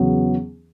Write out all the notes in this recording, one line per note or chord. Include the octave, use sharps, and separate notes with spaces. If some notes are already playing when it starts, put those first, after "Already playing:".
Already playing: E2 C#3 F#3 B3